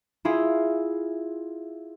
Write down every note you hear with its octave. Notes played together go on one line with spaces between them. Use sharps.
E4 F4 G#4